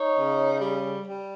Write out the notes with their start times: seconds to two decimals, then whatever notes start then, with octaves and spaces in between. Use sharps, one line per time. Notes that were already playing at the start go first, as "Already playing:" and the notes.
Already playing: D#4 C#5
0.17 C#3
0.61 G3
1.05 G3